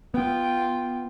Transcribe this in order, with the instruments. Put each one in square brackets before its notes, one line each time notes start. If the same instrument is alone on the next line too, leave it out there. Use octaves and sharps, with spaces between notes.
[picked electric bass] B3 [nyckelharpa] F4 G5